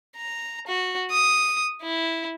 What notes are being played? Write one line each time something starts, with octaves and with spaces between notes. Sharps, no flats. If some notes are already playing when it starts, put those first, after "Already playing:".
A#5
F#4
D#6
E4